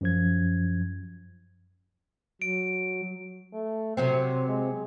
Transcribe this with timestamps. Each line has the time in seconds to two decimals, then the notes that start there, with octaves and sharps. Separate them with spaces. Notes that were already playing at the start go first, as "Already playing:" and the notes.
0.01 F#2 F3 G#6
2.42 F#3 D7
3.53 A3
3.97 C3 F#3 C4 C5
4.48 G#3